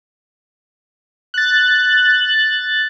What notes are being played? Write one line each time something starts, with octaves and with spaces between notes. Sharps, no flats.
F#6 A6